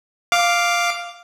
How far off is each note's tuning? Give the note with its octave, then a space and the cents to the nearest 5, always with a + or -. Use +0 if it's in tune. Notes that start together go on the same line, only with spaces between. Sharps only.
F5 +0 D6 +0